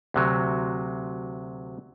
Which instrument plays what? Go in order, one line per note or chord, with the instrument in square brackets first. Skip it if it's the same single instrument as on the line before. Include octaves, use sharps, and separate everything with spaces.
[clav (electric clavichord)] D2 C3 F#3